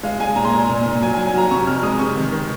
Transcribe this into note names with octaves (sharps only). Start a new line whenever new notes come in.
G#3 F5
G#3 G#5
A#2 A#5
C6
A#2 A#5
A#2
A#2
F#3 G#5
G#5
F#3
G#5
F#3 A#5
C3 C#6
F2 F6
G#3 D#6
C3 C#6
D#3
D#3